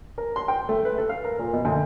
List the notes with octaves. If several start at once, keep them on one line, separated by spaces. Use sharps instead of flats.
A#4
C6
G5
A3
B4
A4
F5
A#4
A#2
B2
D2